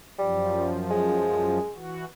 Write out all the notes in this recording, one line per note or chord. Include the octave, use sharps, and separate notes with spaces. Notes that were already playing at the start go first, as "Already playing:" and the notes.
F#2 F3 G3
G#3
E3 F#4